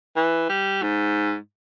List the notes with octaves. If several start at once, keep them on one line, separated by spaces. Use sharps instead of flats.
E3
G3
G#2